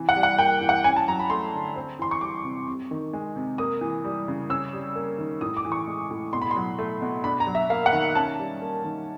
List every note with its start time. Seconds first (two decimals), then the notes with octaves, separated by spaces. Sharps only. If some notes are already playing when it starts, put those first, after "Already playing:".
Already playing: C3 E3
0.09 F#5
0.16 G3
0.23 F#5
0.39 A#3 G5
0.61 E3
0.69 F#5
0.84 C#4 G#5
0.96 A5
1.08 F#3 A#5
1.20 B5
1.30 A3 C6
1.54 D3
1.76 C4
1.99 E3 C6
2.11 C#6
2.21 G3 D6
2.44 C3
2.67 C3
2.91 D#3
3.13 G#3
3.36 C3
3.58 A#3 D#6
3.81 E3
4.04 G3
4.28 C#3
4.50 C#4 E6
4.73 G3
4.95 A#3
5.19 D#3
5.41 A2 D#6
5.57 D6
5.65 E3
5.72 C#6
5.88 G#3
6.11 A2
6.33 B2 C6
6.42 B5
6.51 C6
6.56 F#3
6.79 A3
7.02 B2
7.24 D4 B5
7.40 A#5
7.47 F#3
7.55 E5
7.70 A#3 F5
7.86 F#5
7.93 D#3
8.15 C#4 A5
8.39 G3
8.62 A#3
8.84 D#3